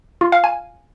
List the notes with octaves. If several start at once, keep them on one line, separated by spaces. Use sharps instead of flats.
F4
F5
G#5